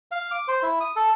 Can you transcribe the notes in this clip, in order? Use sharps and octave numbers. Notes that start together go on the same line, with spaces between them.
F5
D6
C5
E4
D#6
A4